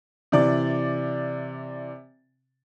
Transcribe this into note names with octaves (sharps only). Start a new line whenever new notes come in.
C3 E3 D5 D6